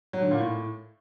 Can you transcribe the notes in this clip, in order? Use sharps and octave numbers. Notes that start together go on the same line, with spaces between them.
F#3
D3
A#2
A2